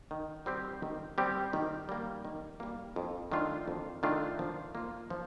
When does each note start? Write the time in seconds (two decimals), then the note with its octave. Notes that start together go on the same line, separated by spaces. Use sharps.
0.11 D#3
0.46 G3 C4 G4
0.83 D#3
1.18 G3 C4 G4
1.53 D#3
1.89 G3 A#3
2.25 D#3
2.60 G3 A#3
2.96 F2
3.32 D#3 A3 D4 F4
3.68 F2
4.03 D#3 A3 D4 F4
4.39 F3
4.75 A#3 F4
5.10 F3